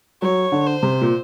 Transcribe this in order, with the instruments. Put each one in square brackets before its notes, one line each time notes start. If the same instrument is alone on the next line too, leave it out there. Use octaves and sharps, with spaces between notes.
[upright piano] F#3 [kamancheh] C#5
[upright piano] D3
[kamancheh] C5
[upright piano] C3
A#2